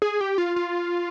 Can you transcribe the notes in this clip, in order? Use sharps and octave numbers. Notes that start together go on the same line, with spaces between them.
G#4
G4
F4
F4